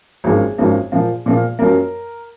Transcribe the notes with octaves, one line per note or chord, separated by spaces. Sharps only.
G#1 F#2 F3 A#3 D#4 G#4
G#1 F#2 F3 A#3 D#4
A#2 F3 A#3 F4
A#2 F3 A#3 F4
F#2 F3 A#3 A#4